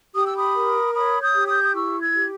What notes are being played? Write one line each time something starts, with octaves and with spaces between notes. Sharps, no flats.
G4 D#6
E6
B5 D#6
A#4
C#5 B5 D#6
D#6 G6
G4
D#6 G6
D#6
E4 C#6 E6
E6 G#6
G4